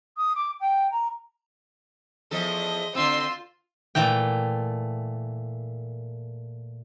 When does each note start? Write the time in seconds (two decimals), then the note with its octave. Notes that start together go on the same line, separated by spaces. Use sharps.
0.16 D#6
0.35 D6
0.60 G5
0.91 A#5
2.31 E2 F3 A4 D#5
2.95 D3 C4 F4 C6 E6
3.95 A#2 E3 A3 G5